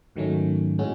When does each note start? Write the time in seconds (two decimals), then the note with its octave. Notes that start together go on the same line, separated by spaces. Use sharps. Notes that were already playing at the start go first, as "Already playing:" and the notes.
0.16 G#2 D#3 F#3 A3 C#4
0.78 A2 G#3 C#4 F#4